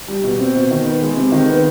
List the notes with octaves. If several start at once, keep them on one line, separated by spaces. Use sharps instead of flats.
G3
B2
C4
B2
D#3
B3
G#3
C3
D#3
B3